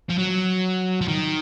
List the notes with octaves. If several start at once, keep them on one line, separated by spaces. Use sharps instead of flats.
F3
F#3
F3
D#3